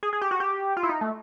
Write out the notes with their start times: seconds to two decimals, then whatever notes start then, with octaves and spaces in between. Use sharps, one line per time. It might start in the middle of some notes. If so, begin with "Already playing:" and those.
0.03 G#4
0.13 G#4
0.21 G4
0.31 F#4
0.40 G4
0.77 F4
0.83 E4
0.89 D#4
1.01 A3